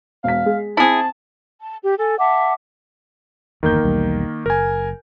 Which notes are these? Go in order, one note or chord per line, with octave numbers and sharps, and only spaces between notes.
E1 F5 B6
G#3
C4 E4 G#4 A5 F#7
A5
G4
A4 G#5
E5 F#5 A5 D6
G1 E2 D#3 A#3 G6
B1 E2 G3
F#1 A#4 G#5